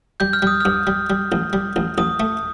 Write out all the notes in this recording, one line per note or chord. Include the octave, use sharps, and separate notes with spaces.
G3 G6
F6
G3 D#6
G2 F6
G3
G3
A1
G3
A1
A1 D#6
A3